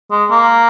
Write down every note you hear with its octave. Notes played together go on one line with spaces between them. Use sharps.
G#3
A#3